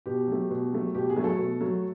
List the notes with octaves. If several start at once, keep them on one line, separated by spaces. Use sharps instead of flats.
B2 G4
F#3 A3
B2
F#3 A3
B2 G4
G#4
F#3 A3
A4
B2
F#3 A3